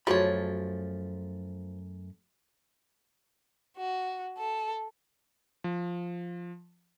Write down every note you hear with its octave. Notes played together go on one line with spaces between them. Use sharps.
F#2 F3 A3 F4 F#4 G#4 C#5 B5
F#4
A4
F3